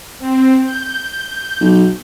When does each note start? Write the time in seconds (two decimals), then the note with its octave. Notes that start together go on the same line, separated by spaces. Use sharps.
0.19 C4
0.65 G6
1.61 B1